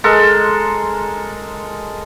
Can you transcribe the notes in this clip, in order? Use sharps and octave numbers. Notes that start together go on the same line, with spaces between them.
G#3 A4 A#4